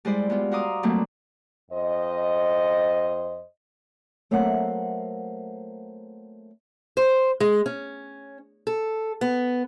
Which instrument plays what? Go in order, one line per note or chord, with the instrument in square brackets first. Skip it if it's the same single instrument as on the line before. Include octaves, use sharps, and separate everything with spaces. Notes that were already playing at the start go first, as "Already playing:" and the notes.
[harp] G3 G#3 E4 C5 D5
G#3 B3 F4
F#4 F5 A#5 C6 D6 D#6
F#3 G3 A3 A#3 C4
[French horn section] F2 C5 D#5
[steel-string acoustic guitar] F#3 A3 A#3 C4 E5 F#5
C5
G#3
C#4
A4
B3